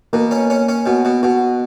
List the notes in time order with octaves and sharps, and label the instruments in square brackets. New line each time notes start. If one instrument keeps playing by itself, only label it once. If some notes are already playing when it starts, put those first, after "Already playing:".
[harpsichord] B2 [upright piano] A#3
[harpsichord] C#4
C#4
C#4
[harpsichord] B2 [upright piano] F#4
[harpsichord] B2
[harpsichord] B2 [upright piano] F#4